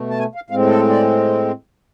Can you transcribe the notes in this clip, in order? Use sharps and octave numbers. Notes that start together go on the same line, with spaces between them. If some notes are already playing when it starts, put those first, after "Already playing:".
Already playing: B2 A3
A5
G#5
F5
A2 G#3 C4 F5
A4
D5